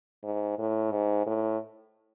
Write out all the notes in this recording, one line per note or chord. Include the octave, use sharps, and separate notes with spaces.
G#2
A2
G#2
A2